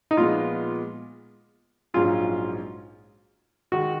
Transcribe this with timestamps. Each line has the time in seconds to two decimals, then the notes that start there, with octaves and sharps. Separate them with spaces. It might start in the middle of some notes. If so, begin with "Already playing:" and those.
0.11 D#4
0.17 A#2 F3 G#3 B3 F4
1.94 A#1 G#2 F#3 C#4 F4 G#4
3.72 D#3 G#3 F#4